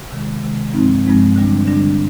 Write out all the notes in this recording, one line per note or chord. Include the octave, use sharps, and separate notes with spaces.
C3 D#3 G#3
C3 D#3 G#3
G2 F3 G#3 C4 D#4
G2 F3 G#3 C4 D#4
D3 G3 D4
D3 G3 D4